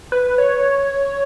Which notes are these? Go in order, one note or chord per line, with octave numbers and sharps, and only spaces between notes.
B4
C#5